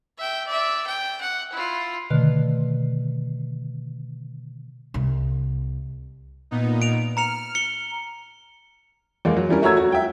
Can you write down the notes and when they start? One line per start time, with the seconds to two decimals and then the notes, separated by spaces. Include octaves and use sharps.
0.18 E5 G5
0.47 D5 E5
0.87 G5
1.21 F#5
1.52 E4 F4
2.10 B2 D3 D#3 A3
4.94 C2
6.51 A#2 B3 D#4
6.82 D7 F7
7.17 A#5 F6 C#7 F7
7.55 C#7 G7
9.25 E2 G#3 A#3
9.37 F#3
9.49 E3 G3 C#4 A#4
9.62 A3 F#4 C#5 A#5 E6 G#6
9.77 F#4
9.92 E5 G5